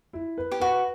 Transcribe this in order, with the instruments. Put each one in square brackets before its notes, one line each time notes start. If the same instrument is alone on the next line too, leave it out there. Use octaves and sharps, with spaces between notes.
[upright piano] E4
B4
[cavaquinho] G4
[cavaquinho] F#4 [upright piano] B4